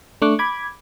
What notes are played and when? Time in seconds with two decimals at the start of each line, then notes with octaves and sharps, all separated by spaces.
0.22 A3 D4 C#6 D6 F#6
0.39 B5 D6 G#6